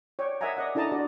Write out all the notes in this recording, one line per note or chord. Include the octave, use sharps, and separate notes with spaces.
C#5 D5 G5
A#4 D#5 E5 F#5 G#5 A#5
D5 D#5 F#5
D4 E4 A4 D#5 A5 A#5
D4 F#4 D5